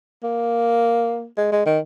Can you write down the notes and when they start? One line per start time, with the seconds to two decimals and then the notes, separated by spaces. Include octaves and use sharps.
0.24 A#3
1.38 G#3
1.52 G#3
1.66 D#3